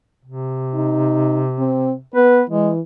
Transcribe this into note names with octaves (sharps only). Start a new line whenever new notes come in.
C3
D#4
C4
B3 B4
E3 G#3